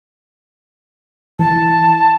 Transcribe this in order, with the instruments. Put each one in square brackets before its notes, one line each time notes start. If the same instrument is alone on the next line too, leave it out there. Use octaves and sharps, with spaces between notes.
[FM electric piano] E3 [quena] A5